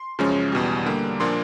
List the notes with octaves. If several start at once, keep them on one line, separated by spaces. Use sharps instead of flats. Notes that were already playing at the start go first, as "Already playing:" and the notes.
Already playing: C6
F#2 C#3 F3 G#3 C#4
E2 B2 G3
D3 G3 A#3
A#2 F3 A#3 D4 F4 C6